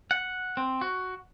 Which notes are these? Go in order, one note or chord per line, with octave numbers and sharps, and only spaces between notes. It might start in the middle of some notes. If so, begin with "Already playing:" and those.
F#5
C4
F#4